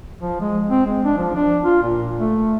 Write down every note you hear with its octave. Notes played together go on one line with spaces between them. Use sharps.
F3
G#3
C4
G#3
D4
F3
D4
F4
A#2
A3